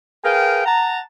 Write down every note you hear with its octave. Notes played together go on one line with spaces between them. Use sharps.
G#4 A#4 B4 F5 G5
F#5 A5 A#5